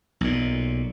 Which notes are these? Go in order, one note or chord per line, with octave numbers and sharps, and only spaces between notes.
B1 A#2